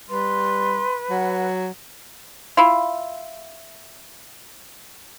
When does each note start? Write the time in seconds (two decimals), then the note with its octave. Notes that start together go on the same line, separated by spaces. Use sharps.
0.09 G3 B4 C6
1.10 F#3 F#5
2.57 E4 F4